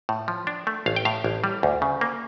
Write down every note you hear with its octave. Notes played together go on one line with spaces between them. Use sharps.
A2
F3
D4
A3
A1 F5
G5
A2 F5
A1
G3
D2
C#3
A#3